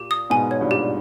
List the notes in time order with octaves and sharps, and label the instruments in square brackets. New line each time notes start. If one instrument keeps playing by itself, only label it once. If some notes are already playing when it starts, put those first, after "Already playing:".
Already playing: [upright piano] A#2 [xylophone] G4
[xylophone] D#6
[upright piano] G#2 B2 [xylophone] G#5
[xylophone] C#5
[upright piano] G2 A#2
[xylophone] G4